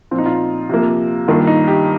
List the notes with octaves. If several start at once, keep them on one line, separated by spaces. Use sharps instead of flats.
A#2 F3 C4 F4
D#4
F4
C3 F3 A#3
G2 D#3 A#3 F4
D#4
G4